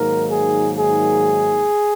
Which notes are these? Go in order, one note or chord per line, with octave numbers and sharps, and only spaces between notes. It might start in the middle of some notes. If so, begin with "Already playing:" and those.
Already playing: G#2 D#3 F#3 A#3 A#4
G#4
G#4